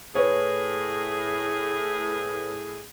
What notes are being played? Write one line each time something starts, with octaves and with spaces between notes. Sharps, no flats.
A2 G#4 B4 C#5